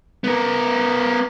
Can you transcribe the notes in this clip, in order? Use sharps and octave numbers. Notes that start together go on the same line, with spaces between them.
B3 A#4